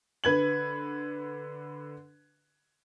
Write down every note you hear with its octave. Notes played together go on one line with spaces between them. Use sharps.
D3 B4 G#6 F#7